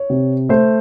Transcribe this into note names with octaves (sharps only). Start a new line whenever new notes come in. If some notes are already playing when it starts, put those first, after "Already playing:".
Already playing: C#5
C3
A3 C5